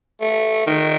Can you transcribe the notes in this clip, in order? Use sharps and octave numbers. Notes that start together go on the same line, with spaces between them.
A3
D#3